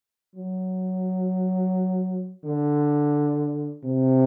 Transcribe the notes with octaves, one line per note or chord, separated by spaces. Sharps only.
F#3
D3
C3